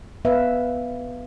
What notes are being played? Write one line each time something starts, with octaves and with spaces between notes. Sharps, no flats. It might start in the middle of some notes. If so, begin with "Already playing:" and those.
B3 B4 E5 F5